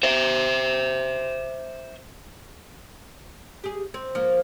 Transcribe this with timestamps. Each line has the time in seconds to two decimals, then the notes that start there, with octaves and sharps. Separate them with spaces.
0.03 C5 E5
3.64 G4 G#4
3.94 C4
4.15 F3 A#3